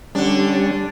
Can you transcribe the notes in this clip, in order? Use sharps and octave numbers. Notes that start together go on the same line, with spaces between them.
D3 G3 C#4 D4